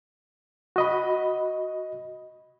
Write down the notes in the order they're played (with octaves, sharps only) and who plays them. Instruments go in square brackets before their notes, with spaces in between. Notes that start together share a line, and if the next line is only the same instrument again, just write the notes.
[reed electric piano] F#4 D#5 B5